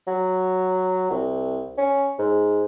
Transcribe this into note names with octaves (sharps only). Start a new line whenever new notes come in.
F#3
C2
C#4
G#2